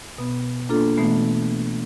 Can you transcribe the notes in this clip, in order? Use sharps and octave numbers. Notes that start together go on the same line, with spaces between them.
B2 B3
A#3 D4 F4 A4
B2 E3 A3 B3